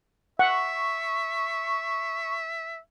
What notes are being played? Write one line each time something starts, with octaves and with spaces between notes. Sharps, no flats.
E5 F#5 C#6